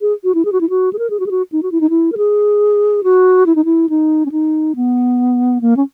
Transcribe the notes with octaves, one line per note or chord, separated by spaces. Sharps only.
G#4
F#4
E4
G#4
F#4
E4
F#4
G#4
A#4
G#4
F#4
G#4
F#4
D#4
F#4
E4
D#4
E4
A#4
G#4
F#4
E4
D#4
E4
D#4
C#4
D#4
B3
A#3
C#4